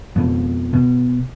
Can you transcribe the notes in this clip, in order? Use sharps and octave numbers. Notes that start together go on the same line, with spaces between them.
F2 B2
B2